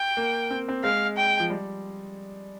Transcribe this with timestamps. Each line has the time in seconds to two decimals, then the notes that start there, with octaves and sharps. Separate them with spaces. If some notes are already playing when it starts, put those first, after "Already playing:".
Already playing: G5
0.17 A#3
0.51 C4
0.69 C4
0.84 G#3 F5
1.17 G5
1.40 F3
1.50 G3